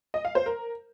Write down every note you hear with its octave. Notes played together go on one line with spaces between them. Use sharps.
D#5
F5
C5
A#4